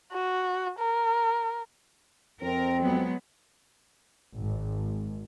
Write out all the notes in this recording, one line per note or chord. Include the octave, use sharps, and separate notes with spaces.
F#4
A#4
F2 C4 A#4
F#3 G#3 B3
G#1